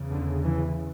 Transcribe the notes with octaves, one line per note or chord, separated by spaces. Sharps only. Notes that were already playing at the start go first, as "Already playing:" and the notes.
Already playing: E2 C#3
D3
E3